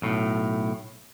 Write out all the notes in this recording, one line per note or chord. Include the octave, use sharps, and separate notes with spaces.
B1 A2